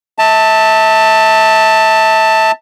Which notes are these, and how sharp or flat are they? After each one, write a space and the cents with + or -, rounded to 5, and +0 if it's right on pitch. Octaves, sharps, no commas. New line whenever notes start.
E5 -30 A5 +15